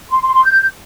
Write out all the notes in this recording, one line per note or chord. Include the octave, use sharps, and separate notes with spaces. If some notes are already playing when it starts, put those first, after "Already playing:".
C6
C6
C6
G6